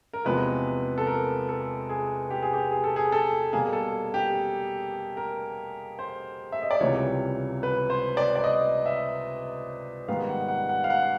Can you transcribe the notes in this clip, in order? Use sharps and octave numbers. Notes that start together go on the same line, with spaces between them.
A#4
E2 C3 F3 G#3 B3 B4
A4
A#4
A4
G#4
G4
G#4
G4
G#4
A4
G#4
A4
B2 G3 A#3 G#4
A4
G4
A#4
C5
E5
D#5
D5
C#2 C3 E3 G3 A#3 C#5
B4
C5
D5
D5
D#5
E5
G#2 D#3 G3 B3 F5
F#5
F#5
F#5
F5
F#5